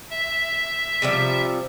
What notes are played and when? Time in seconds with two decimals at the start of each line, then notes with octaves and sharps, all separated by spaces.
0.10 E5
1.02 C3 F3 G3